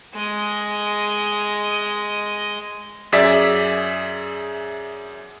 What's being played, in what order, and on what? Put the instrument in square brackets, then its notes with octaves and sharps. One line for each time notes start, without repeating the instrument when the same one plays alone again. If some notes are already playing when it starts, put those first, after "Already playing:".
[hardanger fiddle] G#3 D#5
[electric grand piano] F#2 G#4 D5 E5 B6